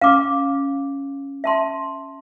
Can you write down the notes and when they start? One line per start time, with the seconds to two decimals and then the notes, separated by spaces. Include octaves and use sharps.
0.01 C#4 F5 D6 F6
1.44 E5 A5 C6